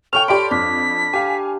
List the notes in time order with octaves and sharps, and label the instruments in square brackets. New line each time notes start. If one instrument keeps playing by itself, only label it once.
[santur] A4 C#5 [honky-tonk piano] G5 C#6 F6 [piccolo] F7
[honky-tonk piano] G4 D5 C6 [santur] B5 [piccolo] D7
[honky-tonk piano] F2 [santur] D4 [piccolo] B6
[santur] G4 [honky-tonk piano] F5 G#5